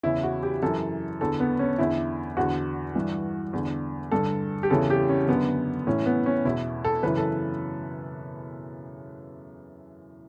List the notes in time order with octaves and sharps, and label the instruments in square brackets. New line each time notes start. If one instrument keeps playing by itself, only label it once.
[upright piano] E2 C#3 E3 E4
F#4
G4
F#2 E3 A4
E2 D3 A4
B3
C#4
E2 D3 E4
E2 D3 F#4
G2 E3
E2 D3
G2 D3 A4
G4
E2 C#3 E3 A4
G4
C#4
F#2 D3 B3
A2 E3 C#4
B3
C#4
E2 B2 E4
A4
F#2 C#3 E3 B4
A4